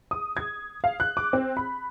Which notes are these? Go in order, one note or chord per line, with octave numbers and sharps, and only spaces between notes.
D#6
G#6
F5
F#6
D6
C4
B5